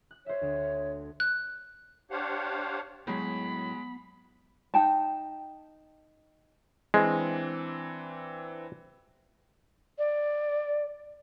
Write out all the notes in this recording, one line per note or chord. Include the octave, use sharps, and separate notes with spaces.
F#6
C5 C#5 E5
D2
F#6
D4 G4 C5 C#5 F5 F#5
A2 F#3 G#3 B3 B5
D#4 G5 A5
E3 G#3 C4 D4
D5